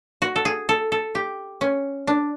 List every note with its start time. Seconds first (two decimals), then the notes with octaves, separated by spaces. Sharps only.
0.22 F#4
0.36 A4
0.45 G#4
0.69 A4
0.92 A4
1.15 G4
1.61 C#4
2.07 D4